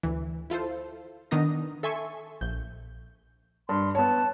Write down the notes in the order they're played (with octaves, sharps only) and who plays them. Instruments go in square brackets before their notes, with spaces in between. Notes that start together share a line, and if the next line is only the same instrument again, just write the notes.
[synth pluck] D2 E3
E4 F4 A4 C5
D#3 B3 D4 D#4 D#6 A#6
A4 E5 G#5 C6 C#6
A#1 G6
[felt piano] G2 [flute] C6
[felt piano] B3 C#5 [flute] A5